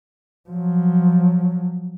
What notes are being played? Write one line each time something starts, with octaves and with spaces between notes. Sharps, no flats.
F3 F#3